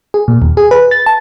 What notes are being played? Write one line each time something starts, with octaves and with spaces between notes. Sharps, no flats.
G#4
A#2
D#2
G#4
B4
A6
A5